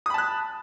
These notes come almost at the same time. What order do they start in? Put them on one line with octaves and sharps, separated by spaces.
D#6 B5 A5 F#6